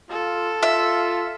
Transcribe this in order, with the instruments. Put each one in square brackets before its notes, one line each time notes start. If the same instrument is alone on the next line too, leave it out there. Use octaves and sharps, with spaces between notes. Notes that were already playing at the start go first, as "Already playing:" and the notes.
[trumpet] F4 [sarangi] A4
[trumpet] F4 [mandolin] E5